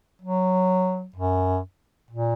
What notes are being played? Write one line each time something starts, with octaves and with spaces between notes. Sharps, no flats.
F#3
F#2
A#2